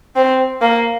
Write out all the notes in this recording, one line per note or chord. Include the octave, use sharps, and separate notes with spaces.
C4
A#3